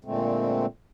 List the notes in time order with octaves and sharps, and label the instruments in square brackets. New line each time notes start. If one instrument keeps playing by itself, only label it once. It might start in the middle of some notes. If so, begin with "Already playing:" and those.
[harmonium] A#2 D3 G#3 A3 C4